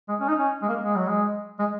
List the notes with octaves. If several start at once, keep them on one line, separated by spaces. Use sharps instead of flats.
G#3
C#4
D#4
C#4
G#3
A#3
G#3
F#3
G#3
G#3